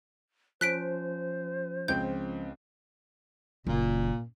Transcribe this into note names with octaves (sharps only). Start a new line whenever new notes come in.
F3 C#4 C5 F#6 B6 D7
C#2 C4 G5 G6
F#1 A#2